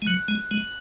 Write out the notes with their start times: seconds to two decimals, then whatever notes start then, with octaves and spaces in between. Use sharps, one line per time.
0.02 G#3
0.07 F#3 F#6
0.28 G#3
0.51 G#3 F#7